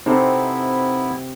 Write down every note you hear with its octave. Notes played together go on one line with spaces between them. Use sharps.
C3 B3 C4 D#4 E4 A4